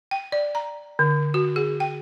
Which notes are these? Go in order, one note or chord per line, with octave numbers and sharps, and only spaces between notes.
G5
D5
A#5
D3
F#4
G#4
G5